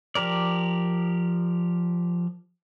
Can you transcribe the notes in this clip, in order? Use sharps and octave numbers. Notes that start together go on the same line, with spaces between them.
F3 G4 A#4 D5